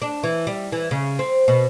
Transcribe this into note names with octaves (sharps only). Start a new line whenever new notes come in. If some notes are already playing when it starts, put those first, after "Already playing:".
D4
E3
G3
E3
C#3
C4
B2